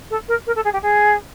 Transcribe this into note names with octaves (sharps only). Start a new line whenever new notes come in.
A4
A#4
A#4
A4
G#4
G4
G#4